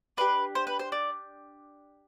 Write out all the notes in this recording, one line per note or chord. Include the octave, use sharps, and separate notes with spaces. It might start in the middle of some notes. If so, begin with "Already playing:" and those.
D4 G4 B4
C5
B4
C5
D5